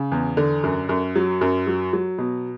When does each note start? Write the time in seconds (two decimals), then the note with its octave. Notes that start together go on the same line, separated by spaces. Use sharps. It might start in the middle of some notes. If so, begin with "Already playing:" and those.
Already playing: C#3
0.12 E2
0.37 D3
0.63 F#2
0.89 F#2
1.16 F#3
1.41 F#2
1.67 F#3
1.93 F#3
2.18 B2